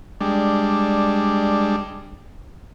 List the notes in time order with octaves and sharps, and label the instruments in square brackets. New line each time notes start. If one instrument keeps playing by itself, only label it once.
[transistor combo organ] G3 G#3 D4